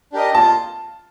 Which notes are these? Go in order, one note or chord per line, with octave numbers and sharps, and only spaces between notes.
D4 G4 A#4 D#5
F4 A5